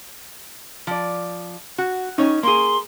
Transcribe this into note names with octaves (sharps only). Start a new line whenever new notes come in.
F3 D5
F#4
C#4 D#4 C#5
A#3 G#4 C6